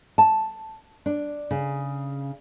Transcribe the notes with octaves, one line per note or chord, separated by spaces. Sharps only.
A5
D4
C#3